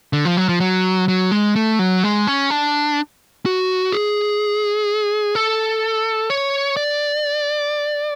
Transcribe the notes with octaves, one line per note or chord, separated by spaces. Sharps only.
D3
F3
F#3
F3
F#3
F#3
G#3
A3
F#3
G#3
C#4
D4
F#4
G#4
A4
C#5
D5